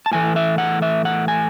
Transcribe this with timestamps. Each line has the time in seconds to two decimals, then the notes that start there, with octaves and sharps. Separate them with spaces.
0.06 A5
0.12 A2 E3 A3 G#5
0.36 E5
0.58 F#5
0.82 E5
1.05 F#5
1.28 G#5